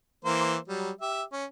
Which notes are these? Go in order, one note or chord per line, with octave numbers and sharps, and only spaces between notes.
E3 A#3 C5
F#3 G3
G4 E5
C#4